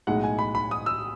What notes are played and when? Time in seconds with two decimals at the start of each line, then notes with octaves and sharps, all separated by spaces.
0.07 B1 A2 G#3 D#4 F#5
0.24 G#5
0.39 B5
0.55 B5
0.71 D#6
0.86 E6